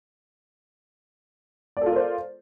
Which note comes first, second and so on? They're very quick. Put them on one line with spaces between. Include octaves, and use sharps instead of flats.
D5 A4 F4 A#4 C5